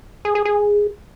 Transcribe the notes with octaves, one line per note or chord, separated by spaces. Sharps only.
G#4
G#4
G#4